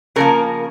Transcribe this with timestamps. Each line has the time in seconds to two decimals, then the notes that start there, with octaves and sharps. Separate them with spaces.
0.16 C#3 F3 A#3 A#4